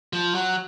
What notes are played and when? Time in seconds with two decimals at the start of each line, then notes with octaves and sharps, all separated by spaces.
0.13 F3
0.35 F#3